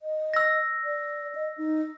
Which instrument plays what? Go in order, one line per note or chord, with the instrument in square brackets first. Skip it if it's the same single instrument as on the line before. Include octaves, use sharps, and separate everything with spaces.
[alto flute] D#5
[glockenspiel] E6 A#6
[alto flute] D5
D#5
D#4